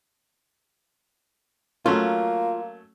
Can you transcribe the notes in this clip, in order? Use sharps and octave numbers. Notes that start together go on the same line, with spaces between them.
F#3 A3 A#3 C#4 F4